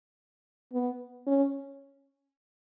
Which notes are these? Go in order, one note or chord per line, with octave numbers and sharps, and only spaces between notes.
B3
C#4